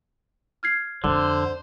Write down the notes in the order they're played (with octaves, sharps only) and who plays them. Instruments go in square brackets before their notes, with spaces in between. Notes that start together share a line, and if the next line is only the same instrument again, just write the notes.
[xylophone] F6 G#6 C7
[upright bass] F2 [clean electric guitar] D3 [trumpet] C5